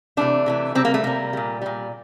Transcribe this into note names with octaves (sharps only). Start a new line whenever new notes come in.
C3 E3 A3 D4
C3 E3 A3
C3 G3 C4
A#3
A3
C3 G3 A#3
A#2 G3
A#2 G3